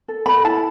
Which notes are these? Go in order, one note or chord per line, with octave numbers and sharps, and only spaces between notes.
A4
A4 B5
E4 A5